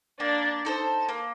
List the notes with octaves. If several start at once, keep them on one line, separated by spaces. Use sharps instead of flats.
A#3 D4 D5
D#4 A4 C5
A#3